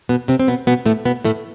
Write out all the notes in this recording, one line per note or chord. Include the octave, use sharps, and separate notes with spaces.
B2 B3
C3 C4
C4
B2 B3
B2 B3
A2 A3
B2 B3
A2 A3